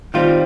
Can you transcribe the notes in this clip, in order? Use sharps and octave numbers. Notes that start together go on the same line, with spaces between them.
D#3 G3 C4 F4